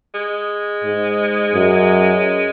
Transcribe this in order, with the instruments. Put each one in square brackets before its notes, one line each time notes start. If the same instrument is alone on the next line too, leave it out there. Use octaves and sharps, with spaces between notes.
[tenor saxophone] G#3
[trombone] G#2
F#2